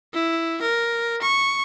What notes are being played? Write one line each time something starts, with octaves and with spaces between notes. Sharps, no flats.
E4
A#4
C#6